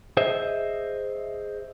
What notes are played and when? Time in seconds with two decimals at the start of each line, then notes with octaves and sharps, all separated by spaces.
0.17 G#4 C5 D#5 E5